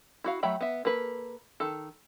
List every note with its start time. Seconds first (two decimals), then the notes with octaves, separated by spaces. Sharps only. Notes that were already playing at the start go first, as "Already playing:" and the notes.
0.24 E4 F#4 F5
0.43 F#3 A3 E5 G5 B5
0.61 B3 E5
0.85 A#3 A4 B4
1.60 D#3 A4